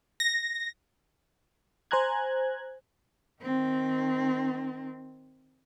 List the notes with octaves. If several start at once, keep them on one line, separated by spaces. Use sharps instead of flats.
A#6
C5 G#5 A#5 F#6 G#6
D#3 C4